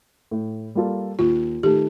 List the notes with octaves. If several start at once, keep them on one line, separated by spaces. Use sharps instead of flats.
A2
G3 A#3 F4 A4
D#2 F4
D#3 A3 D#4 G4 A4